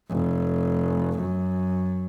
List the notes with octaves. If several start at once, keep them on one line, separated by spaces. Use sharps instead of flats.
F1
F#2